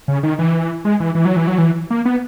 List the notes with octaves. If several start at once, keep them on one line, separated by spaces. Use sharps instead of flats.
C#3
D#3
E3
G#3
E3
E3
F#3
E3
F#3
E3
A#3
B3